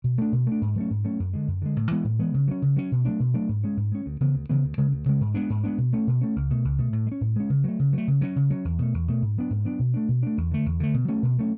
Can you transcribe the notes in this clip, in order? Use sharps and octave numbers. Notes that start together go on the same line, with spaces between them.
B2
A3 D4
B2
A3 D4
G#2
F#3 A3 C#4
G#2
F#3 A3 C#4
F#2
D3 G#3
F#2
D3 G#3
A2
E3 G#3 B3
A2
E3 G#3 B3
C#3
F#3 C#4
C#3
F#3 C#4
B2
F#3 A3 D4
B2
F#3 A3 D4
G#2
G#3 C#4
G#2
G#3 C#4
D2
C#3 E3 B3
D2
C#3 E3 B3
D2
C#3 G#3
D2
C#3 G#3
G#2
G#3 B3 D4
G#2
G#3 B3 D4
B2
A3 C#4
B2
A3 C#4
C#2
B2 A3
C#2
B2 A3
A2
G#3
C#4
A2
G#3 C#4
C#3
F#3 A3
C#3
F#3 A3
C#3
F#3 C#4
C#3
F#3 C#4
E2
B2 A3
E2
B2 A3
G#2
F#3 B3 D4
G#2
F#3 B3 D4
B2
A3 D4
B2
A3 D4
E2
D3 A3
E2
D3 A3
B2
F#3 A3 C#4
B2
F#3 A3 C#4